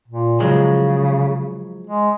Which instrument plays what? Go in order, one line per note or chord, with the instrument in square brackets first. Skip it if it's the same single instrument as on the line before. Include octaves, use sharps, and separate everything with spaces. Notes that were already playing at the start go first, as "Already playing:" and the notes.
[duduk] A#2
[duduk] C#3 [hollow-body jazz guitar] F3 F#3 G#3
[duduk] G#3